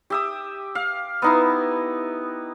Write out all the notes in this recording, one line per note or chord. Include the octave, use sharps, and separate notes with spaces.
G4 E5 D#6
F5
B3 D#4 E4